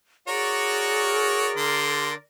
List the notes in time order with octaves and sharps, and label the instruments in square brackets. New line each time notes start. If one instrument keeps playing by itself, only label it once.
[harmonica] F#4 C#5 [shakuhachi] G#4 [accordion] A#4 D5
[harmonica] D3 C6